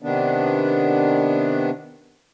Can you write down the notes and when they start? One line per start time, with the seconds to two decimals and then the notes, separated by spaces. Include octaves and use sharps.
0.02 C3 D#3 B3 D4